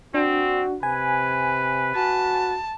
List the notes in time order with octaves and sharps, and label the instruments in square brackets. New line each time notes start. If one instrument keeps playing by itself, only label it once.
[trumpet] C4 [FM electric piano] D4 [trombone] F#4
[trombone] C3 [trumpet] B4 [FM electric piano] G#5
[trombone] F#4 [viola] A5